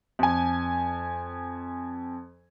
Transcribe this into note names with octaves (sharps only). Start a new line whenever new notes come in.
F2 G#5